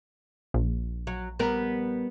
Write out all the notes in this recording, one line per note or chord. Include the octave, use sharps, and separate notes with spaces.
A#1
F#3
G3 B3 A#4